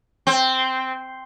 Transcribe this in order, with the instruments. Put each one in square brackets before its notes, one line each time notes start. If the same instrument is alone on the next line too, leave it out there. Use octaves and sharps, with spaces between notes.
[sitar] C4